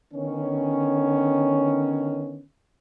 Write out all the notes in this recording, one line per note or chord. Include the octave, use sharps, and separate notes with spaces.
D3 D#3 B3 C#4